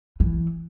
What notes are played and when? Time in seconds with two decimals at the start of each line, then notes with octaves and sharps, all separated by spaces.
0.20 E3